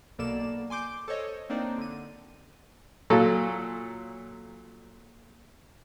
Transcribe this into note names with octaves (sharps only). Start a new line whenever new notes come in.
B1 B2 A#3 A4 D5 E7
G#5 C6 D6 G6
A4 C5 C#5 D#5
A#3 C4 D4 D#4 D5
D3 D#7
A#2 F#3 A4